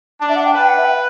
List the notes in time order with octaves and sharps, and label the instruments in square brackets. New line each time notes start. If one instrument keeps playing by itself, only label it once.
[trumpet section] D4 [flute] A5
[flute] E5
F#5
G5
[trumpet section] B4 [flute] A5
[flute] G5
F#5
E5
G5